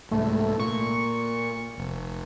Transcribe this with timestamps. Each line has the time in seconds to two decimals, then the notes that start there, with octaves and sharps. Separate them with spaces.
0.11 C2 G#2 A3
0.60 A#2 C#6
1.78 F1